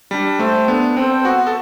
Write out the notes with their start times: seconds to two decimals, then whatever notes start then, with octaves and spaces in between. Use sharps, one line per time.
0.11 G3 D4
0.39 A3 A4 C5 G5
0.68 B3 D4
0.96 C4 A4 C5 G5
1.24 B3 F#4
1.47 A4